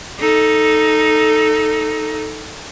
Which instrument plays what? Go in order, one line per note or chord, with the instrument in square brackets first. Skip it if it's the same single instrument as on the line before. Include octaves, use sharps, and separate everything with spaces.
[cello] D#4 A4